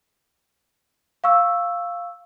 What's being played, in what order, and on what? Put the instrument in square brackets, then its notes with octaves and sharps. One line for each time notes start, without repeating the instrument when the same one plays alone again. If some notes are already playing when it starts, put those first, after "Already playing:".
[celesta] F5 C#6 E6